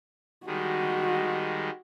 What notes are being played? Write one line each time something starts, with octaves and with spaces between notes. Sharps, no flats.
D#3 G3 G#3 F#4